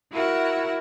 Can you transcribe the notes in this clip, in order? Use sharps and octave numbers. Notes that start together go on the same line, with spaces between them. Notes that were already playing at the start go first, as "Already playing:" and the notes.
E4 F#4 A#4 E5 F#5